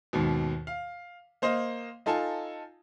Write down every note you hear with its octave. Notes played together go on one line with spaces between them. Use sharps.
D#2 G#2 B2
F5
A#3 C5 D#5 F5
D#4 F4 A4 G#5 A5